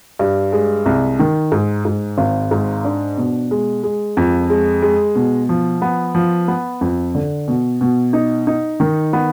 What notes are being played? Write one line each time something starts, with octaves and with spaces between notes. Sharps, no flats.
G2
G#3
C2
D#3
G#2
G#2
G#1
G#2
D4
B2
G#3
G#3
F2
G#3
G#3
B2
F3
B3
F3
B3
F2
D3
B2
B2
D#4
D#4
D#3
B3